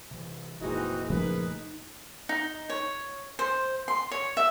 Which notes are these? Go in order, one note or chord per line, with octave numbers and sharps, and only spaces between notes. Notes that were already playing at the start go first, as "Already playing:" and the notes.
C3 E3
F1 A#2 E3 G#3 C4 D#4 F#4
C#3 F3 A3 D#4 G#4 A#4 B4
D#4
C#5
C5
C6
C#5
E5